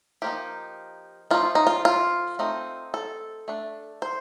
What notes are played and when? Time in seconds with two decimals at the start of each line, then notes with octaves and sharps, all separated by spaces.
0.22 F3 A#3 D#4 G4
1.31 F3 A3 D#4 F4
1.55 D#4
1.67 F4
1.85 F4
2.39 A3 C4 D#4
2.94 A4
3.48 A3 D4
4.02 C5